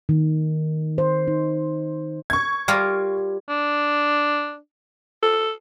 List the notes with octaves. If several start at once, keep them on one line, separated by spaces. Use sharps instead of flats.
D#3
C5
D#4
C#6 G#6
G3 F4 A#4
D4
A4